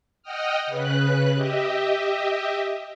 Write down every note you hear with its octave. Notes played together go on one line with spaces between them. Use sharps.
D#5 F#5 G5 D#6 F6
C#3 B4 F#6
G4 D#5 E5